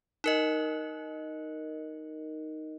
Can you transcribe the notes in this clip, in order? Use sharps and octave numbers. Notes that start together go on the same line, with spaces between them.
D#4 A#4 D#5